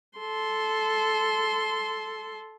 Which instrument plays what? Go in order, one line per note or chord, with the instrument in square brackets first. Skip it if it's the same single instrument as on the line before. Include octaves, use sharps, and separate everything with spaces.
[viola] A4 C6